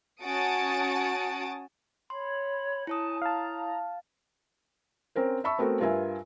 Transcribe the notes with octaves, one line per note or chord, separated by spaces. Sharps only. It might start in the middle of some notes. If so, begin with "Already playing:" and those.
C#4 F#4 A5 D#6 A6 D7
C#5 B5 C6
E4 C#5 G#5 A5 D#6
F5 A5 A#5
C4 C#4 A#4 C5
E5 A5 B5 C#6 E6
A3 B3 C4 F#4 A4 A#4
G2 F4 A#4 B4 E5 G#5